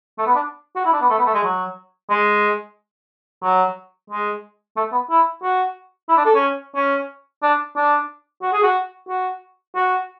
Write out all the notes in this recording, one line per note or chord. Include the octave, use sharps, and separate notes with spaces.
A3
B3
D4
F#4
E4
D4
B3
A3
B3
A3
G#3
F#3
G#3
F#3
G#3
A3
B3
E4
F#4
E4
D4
A4
C#4
C#4
D4
D4
F#4
G#4
F#4
F#4
F#4